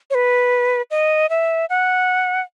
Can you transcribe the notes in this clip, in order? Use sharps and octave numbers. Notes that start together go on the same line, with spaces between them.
C#5
B4
D#5
E5
F#5